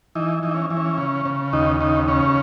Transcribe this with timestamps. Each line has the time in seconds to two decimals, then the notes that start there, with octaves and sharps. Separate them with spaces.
0.15 E3 D#4
0.43 E3 D#4
0.55 C#4
0.70 E3
0.77 C#4
0.98 C#3
1.26 C#3
1.53 D#2 D#4
1.80 C#3 D#4
2.08 C#3 C#4